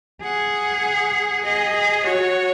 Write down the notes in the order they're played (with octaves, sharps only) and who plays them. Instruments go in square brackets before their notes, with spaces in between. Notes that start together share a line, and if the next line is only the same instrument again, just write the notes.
[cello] G#4 [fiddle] F#5
[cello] G#4 [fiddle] D#5
[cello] G#4
[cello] F#4 [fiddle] C#5